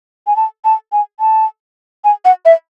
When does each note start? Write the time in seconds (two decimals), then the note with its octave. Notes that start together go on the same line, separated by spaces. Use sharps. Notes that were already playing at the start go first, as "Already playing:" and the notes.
0.27 G#5
0.36 A5
0.65 A5
0.92 G#5
1.20 A5
2.04 G#5
2.25 F#5
2.45 E5